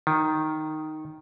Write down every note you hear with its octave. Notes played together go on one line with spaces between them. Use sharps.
D#3